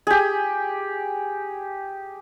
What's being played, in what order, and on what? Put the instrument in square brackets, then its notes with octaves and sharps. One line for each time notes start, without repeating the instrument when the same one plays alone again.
[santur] G4 G#4